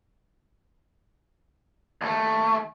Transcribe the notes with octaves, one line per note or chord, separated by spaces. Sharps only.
D#2 A3